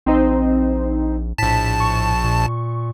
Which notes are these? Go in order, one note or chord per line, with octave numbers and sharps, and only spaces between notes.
A#1 C4 D#4 C5
A#1 A2 A5 B6
C#6
A#2